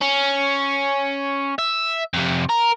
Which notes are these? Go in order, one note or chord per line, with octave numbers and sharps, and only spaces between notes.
C#4
E5
F2 C3
A#4